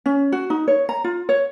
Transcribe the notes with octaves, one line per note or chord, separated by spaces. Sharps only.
C#4
F#4
D#4
C#5
A#5
F4
C#5